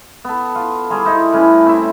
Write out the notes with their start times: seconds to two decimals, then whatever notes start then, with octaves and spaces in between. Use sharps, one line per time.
0.24 B3 A4
0.55 F4
0.90 G3 G#4 A#5 C6
1.05 D#4 E4 C5
1.32 A2 G3 C#4 B4
1.66 C4 C#4 E4 E5